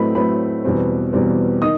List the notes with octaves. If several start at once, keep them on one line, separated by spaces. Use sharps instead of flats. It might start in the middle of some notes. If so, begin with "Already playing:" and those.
Already playing: A2 F#3 A3 C4 B4 D#5 B5
A2 F#3 A3 C4 B4 B5
E2 B2 G3 C4
E2 B2 G3 C4
D#3 D#5 D#6